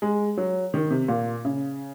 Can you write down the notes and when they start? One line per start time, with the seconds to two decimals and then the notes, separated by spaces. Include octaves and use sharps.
0.02 G#3
0.37 F#3
0.74 D#3
0.90 C3
1.08 A#2
1.45 C#3